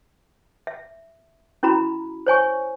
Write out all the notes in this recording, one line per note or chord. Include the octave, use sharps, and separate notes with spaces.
E5
C#4 E4 F#4 A#5 B5
C5 C#5 G#5 C#6